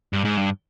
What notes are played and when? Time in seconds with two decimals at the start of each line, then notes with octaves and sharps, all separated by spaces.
0.13 G2
0.25 G#2
0.37 G2